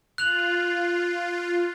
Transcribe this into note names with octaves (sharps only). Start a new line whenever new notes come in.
F4 F#6 F7 F#7